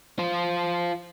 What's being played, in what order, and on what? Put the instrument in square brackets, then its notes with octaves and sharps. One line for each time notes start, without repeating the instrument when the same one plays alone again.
[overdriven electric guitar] F4 C5